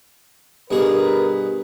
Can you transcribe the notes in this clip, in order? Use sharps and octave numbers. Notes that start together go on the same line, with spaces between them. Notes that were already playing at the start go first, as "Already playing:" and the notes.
G2 B2 G#4 A#4 B4